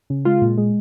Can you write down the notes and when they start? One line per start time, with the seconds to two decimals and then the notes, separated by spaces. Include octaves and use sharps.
0.10 C#3
0.25 G#3 F4
0.41 A#2
0.58 G#3